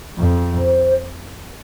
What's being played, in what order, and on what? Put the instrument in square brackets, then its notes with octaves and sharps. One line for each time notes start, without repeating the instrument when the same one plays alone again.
[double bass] F2
[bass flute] C5